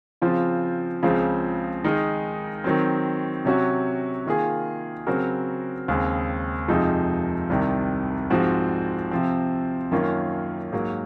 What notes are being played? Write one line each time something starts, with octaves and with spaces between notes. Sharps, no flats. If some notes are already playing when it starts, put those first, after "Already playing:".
C#3 F3 C4 F4
C#2 C#3 F3 C4
D#3 G#3 D#4 A#4
D#3 F#3 C4
C3 F#3 C#4 F#4
D#3 A#3 F4 G#4
C#3 F#3 C4 F#4 A#4
D#2 C#3 G#3 C4
F2 C3 F3 G#3 D#4
C2 C3 D#3
G#2 F3 C4 F#4
C3 F3 C4
F#2 D#3 A#3 C#4 F4
G#2 F#3 A#3